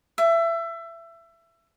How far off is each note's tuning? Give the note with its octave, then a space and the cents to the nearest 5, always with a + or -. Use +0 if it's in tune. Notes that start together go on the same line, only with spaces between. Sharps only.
E5 +25